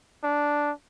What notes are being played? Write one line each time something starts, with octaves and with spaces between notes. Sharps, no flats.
D4